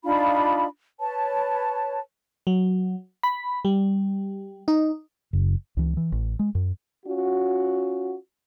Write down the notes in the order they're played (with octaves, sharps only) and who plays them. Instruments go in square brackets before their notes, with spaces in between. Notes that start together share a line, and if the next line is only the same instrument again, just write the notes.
[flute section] D4 D#4 F4 B5
B4 C#5 A5
[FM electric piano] F#3
B5
G3
D#4
[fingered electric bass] F#1
C#2 E3
E3
A1
G#3
F#2
[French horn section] C#4 F4 F#4